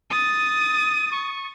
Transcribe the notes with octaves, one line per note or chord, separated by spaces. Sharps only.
D#6 A6 D#7
C#6